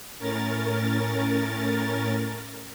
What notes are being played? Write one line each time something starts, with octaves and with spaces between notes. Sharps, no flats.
A2 C#4 A#4 A6